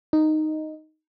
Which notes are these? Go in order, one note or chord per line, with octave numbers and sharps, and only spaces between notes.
D#4